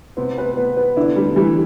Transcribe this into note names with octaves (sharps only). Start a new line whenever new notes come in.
C3 B3 C4
B4
B3
B3
D3 D4 E4
D3 G3 D4
E3 G3 E4